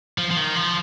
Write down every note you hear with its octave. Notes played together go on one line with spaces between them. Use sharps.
F3
F3
D#3
F3